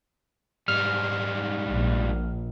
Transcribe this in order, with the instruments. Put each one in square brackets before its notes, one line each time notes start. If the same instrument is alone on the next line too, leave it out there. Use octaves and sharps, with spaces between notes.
[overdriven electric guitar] G#2 G3 [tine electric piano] F6
[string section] A#1